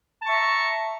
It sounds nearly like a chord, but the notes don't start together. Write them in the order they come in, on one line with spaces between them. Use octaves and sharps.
A5 C#6 E5 A#5